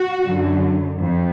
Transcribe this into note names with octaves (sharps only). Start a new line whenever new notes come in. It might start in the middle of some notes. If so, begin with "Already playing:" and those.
Already playing: F#4
F#2 D3 F#3
F2